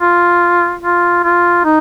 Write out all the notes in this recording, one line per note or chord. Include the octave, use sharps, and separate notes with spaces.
F4
F4
F4
D#4